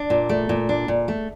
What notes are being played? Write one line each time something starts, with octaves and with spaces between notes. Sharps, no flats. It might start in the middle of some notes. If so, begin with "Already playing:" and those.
Already playing: D4
A#2
A3
A#2
D4
A#2
A3